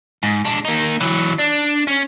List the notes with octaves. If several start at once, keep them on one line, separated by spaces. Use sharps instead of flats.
G#2
G#3 D4
A#3 D#4
E3 F#3
D4
C#4